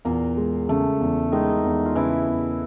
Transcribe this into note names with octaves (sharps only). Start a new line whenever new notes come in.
E2 A#2 A#3
G#3
C#3 A3
E2
D#3 G#3 D#4
E2
F4
C#3 E3 E4
E2